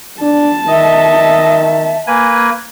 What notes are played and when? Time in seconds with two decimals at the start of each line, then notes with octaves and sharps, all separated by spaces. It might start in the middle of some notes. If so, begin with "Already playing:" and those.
0.21 D4 A5
0.68 D#3 D#5 E5
2.07 A#3 B4 G#5